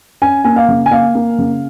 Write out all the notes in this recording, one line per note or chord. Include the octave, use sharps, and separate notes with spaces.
C#4 G#5
A#3 G#5
F5
C#3
G#5
A#3 F5
A#3
C#3